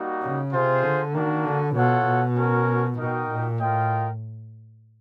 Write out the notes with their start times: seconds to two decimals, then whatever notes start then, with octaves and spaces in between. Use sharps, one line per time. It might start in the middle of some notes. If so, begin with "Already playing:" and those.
Already playing: G3 A#3 D#4 F#4
0.22 C#3
0.52 C3 F4 G#4 C5
0.83 D3
1.14 D#3 A#3 D4 F#4
1.45 D3
1.75 B2 F4 A4 C#5 F#5
2.06 B2
2.37 C#4 F#4 A#4
2.98 B2 D#4 F#4 A#4 D#5 G5
3.30 A#2
3.60 A2 F4 A#4 D#5 G5